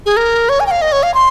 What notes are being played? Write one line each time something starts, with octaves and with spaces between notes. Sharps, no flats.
G#4
A#4
C#5
G#5
G5
F5
D#5
C#5
F5
C6